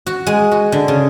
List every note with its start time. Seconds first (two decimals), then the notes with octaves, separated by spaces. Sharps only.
0.06 F#4
0.27 G#3
0.51 F#4
0.72 D3
0.88 C#3